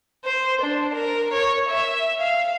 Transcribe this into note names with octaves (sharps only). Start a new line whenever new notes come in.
C5
D4
A#4
C#5
E5
F5